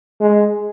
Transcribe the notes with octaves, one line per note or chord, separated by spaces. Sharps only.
G#3